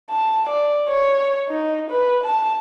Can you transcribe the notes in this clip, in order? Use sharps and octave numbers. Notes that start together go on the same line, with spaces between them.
A5
D5
C#5
D#4
B4
A5